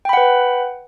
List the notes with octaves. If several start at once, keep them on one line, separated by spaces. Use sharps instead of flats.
B4 F#5 G5 B5